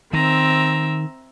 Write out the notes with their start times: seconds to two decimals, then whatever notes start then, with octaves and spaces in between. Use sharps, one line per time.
0.13 D#3 C4 E5 A#5